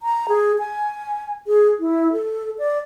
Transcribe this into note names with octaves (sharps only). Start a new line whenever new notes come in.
A#5
G#4
G#5
G#4
E4
A4
D5